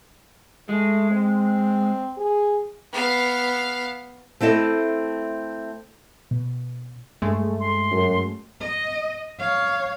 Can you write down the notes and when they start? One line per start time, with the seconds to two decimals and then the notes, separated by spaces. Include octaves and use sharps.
0.69 G#3 A3
1.11 C4
2.18 G#4
2.92 B3 F5
4.41 A3 C4 E4 A4 D#5
6.31 B2
7.22 G2 G#3 A3
7.60 C6
7.92 F#2
8.60 D#5
9.39 C#5 F5